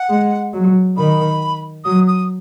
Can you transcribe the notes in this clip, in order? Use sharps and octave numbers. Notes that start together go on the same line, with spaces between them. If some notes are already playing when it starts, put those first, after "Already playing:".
Already playing: F#5
G#3
F#3
D#3 B5
F#3 D#6
D#6